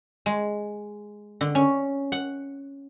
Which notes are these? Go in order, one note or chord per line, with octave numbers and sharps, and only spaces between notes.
G#3
D3
C#4
F#5